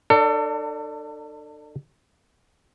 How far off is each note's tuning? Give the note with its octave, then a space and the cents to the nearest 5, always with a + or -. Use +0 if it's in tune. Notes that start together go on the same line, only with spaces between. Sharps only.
D4 +40 A4 +30 D5 -30